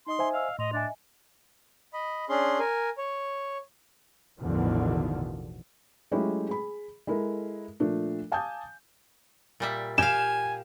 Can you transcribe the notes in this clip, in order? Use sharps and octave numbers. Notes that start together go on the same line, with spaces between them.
D#4 D#5 C6 D#6
C5 E5 G#5
D#5 F5 E6
A2 D#5 C6 F7
D4 D#5 E5 G#5
D#5 B5
C#4 D4 G#4 C6
A#4 G#5
C#5
A1 E2 B2 D3 D#3 F3
F#3 G#3 A3 C#4 E4 G4
G#4 B5
G#3 E4 A4 A#4
A#2 F3 A3 D4
F5 G#5 A5 D6 D#6 G6
A#2 G3 E5
G4 F5 G#5 E7